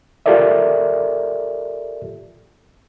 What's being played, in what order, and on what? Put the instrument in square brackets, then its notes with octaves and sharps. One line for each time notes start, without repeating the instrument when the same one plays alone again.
[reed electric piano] F4 G4 A4 A#4 D5 E5